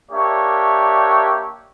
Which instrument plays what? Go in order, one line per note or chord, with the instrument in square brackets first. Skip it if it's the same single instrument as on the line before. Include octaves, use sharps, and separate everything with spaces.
[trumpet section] A#3 D4 G4 C#5 E5